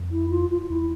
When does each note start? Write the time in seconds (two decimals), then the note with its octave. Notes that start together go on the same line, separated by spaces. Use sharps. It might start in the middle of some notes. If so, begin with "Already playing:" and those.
Already playing: F2
0.11 E4
0.30 F4
0.50 F4
0.61 F4
0.69 E2 E4